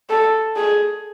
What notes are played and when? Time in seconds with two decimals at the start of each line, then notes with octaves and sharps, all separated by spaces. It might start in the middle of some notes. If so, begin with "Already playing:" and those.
0.09 A4
0.56 G#4